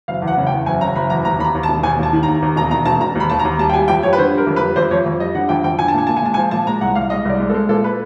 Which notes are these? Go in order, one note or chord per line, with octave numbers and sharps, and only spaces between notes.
F#1 F5
E2
F#5
C#3
G5
E2
F#1 G#5
C#3 A#5
F#1 B5
E2 A#5
D#2 A#5
D#2 B5
A#5
D#2
A5
E1
D#2 G#5
D#2 A5
D#3
A#5
D#2
D#2
E1 A#5
E1 A#5
E1 A5
E1 A#5
D#2 B5
D#2 A5
A#5
D#2
G3 A5
G5
G3 G#5
F2 G5
G3 C#5
B4
D3 C5
G3 A#4
F2
B4
G3
F2 C5
F2 C#5
F2
G3 D#5
D3 F#5
F2 G5
F2 G5
D3 G#5
A5
A#2 G#5
A#2 A5
G#5
G#3 A5
G#5
F3
A#2 A5
G#3 A#5
C2 F#5
C2 F5
G#3 D#5
C2 D5
G#3
A4
G#3
A#2 A4
B4